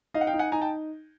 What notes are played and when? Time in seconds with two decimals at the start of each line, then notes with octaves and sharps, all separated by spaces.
0.14 D#4 D#5 F5
0.21 F#5
0.27 F5 G5
0.33 D#4
0.39 F#5 G#5
0.52 D#4 G#5 A#5
0.61 G5 A5